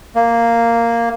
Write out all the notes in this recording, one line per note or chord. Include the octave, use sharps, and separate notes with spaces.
A#3